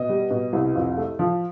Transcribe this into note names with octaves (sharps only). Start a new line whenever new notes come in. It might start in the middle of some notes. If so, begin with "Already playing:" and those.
Already playing: B2 D#5
G3
B2
C2
F2
A3
F3